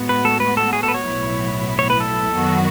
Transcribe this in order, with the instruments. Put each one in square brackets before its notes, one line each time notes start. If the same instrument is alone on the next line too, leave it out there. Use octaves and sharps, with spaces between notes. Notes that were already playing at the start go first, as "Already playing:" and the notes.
Already playing: [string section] A2 G#3 B3 F#4
[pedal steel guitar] B4
A4
B4
A4
G#4
A4
B4
C#5
[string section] B1 A2 F#3 B3 E4
[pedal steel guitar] C#5
B4
A4
[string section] F#2 D#3 F#3 B3 F#4